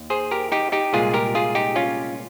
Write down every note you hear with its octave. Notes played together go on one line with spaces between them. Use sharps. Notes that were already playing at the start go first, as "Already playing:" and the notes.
Already playing: D#2
G#4 C5
G4 A#4
D#4 G4
D#4 G4
C2 A#2 G#3 F4 G#4
G4 A#4
F4 G#4
D#4 G4
C#4 F4